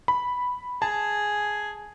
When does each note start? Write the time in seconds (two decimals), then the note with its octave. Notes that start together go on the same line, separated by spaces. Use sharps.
0.08 B5
0.82 G#4 A5